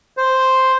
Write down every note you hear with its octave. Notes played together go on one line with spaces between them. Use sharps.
C5